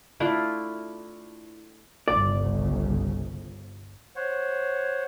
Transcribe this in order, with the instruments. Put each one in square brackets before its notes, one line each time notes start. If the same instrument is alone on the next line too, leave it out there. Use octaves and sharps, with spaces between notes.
[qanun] A3 D4 E4 F4
[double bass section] G1 C2 C#3 [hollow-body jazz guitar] D5
[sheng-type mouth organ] C5 C#5 F#5